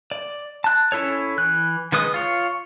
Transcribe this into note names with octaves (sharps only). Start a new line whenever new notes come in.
D5
A5 F#6
C#4 E4 A4 C#5
E3 F#6
D#3 G#3 B4 D#6
F4 C#5